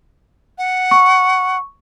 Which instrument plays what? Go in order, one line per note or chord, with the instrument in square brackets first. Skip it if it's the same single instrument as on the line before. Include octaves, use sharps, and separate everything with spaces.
[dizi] F#5
[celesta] C#6